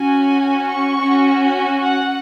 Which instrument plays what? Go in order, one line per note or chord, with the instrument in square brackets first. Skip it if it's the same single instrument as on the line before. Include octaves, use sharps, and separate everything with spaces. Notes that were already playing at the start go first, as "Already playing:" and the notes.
Already playing: [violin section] C#4 F#4 G#5
C#6
C#4 F#4
F#5